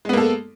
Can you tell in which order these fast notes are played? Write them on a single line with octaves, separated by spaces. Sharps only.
G#3 B3 A#3 A4